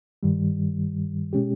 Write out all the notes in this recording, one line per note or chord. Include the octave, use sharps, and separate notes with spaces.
G2 D#3 G3
B2 G#3 C#4 G4